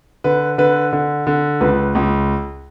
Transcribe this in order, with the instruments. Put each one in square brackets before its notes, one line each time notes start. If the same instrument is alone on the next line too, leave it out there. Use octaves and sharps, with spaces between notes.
[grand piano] D3 B4
D3 B4
D3
D3
C#2 B4
C#2